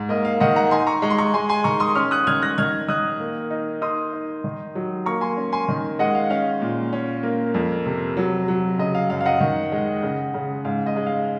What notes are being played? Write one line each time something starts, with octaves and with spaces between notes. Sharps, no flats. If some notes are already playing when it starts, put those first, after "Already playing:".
Already playing: G#2
A#3 D#5
F5
D#3 D#5 F#5
F#5 A#5
D#4 G#5 C6
A#5 C#6
G#3 A#5 C#6
C6
A#5 C#6
G#3 G#5 C6
G#5 C6
D#3 A#5 C#6
C6 D#6
C#4 C#6 F6
D#6 F#6
D#3 F6 G#6
F#6 A#6
D#3 F6 G#6
D#3 D#6 F#6
A#3
D#4
D#4 C6 D#6
D#4
D#3
F#3
A#3 A#5 C#6
G#5 C6
C#4
G#5 C6
D#3
G#3 D#5 F#5
F5
C#4 F5
A#2
C#4
A#3
F2
C3
F#3
F#3
C#3 D#5
F5
F#2 F5
F5
D#5 F#5
D#3
G#3
C#3
C#3
G#2 F5
D#5
G#3
F5